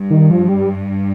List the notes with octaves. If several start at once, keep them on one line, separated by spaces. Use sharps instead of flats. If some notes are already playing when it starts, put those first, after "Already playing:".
Already playing: G2
D#3
F3
G3